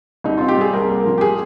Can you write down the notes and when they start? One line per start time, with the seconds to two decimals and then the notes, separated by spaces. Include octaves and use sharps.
0.24 C2 D#4
0.38 C4 F4
0.48 G4
0.58 G3 G#4
0.73 C2 A#4
0.89 A#3
1.06 F3
1.18 G4
1.21 G#4